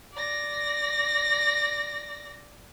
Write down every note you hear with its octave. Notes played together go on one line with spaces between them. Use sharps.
D5 A#6